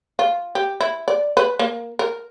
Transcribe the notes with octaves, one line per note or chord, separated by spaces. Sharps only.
F4
G4
E4
D5
B4
A#3
A#4